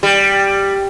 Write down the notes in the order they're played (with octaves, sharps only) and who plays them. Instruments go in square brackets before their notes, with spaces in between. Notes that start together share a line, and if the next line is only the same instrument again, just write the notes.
[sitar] G3